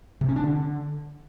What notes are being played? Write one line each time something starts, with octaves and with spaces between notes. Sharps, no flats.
C3
C#4
D4
D3